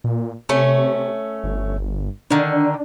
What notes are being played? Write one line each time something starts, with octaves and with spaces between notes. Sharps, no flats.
A#2
C3 A3 C#4
G1
D3 D#3 D4